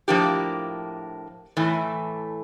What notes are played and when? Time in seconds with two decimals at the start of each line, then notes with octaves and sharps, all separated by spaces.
0.08 A2 F3 A#3 D4 G4
1.57 A2 E3 A3